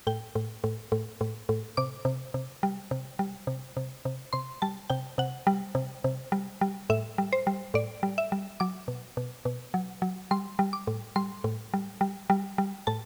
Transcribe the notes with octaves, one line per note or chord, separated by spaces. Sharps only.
A2 G5
A2
A2
A2
A2
A2
C3 D6
C3
C3
G3
C3
G3
C3
C3
C3
C3 C6
G3 A5
C3 G5
C3 F#5
G3
C3
C3
G3
G3
A2 E5
G3
C5
G3
A2 D5
G3
E5
G3
F#3 D6
B2
B2
B2
F#3
F#3
G3 C6
G3
D6
A2
G3 C6
A2
G3
G3
G3
G3
A2 A5